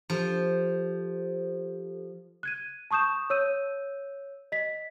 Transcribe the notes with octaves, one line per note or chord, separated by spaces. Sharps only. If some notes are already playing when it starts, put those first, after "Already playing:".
F3 G4 A4 C5
F#6 G#6 D#7
A5 C#6 D#6 G6 E7
C#5 E6 G6 D#7
D#5 B6